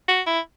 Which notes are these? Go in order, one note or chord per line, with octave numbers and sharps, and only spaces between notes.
F#4
E4